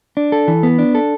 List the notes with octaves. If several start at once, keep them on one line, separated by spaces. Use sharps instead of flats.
D4
A4
E3
B3
D4
A4